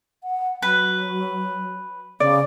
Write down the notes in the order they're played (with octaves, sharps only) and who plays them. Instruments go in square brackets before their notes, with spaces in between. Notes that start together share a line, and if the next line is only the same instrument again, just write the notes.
[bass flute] F#5
[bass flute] F#3 [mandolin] B4
[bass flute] C#3 [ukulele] D5